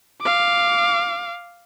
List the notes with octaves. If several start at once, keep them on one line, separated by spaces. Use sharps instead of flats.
F5 D6